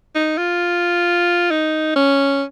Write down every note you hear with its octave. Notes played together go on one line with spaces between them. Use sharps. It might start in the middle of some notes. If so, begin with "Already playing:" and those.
D#4
F4
D#4
C#4